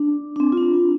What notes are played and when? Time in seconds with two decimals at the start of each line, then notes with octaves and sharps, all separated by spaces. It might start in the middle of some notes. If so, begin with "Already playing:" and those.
Already playing: D4
0.36 D4
0.40 C4
0.52 F4
0.57 D4
0.73 F4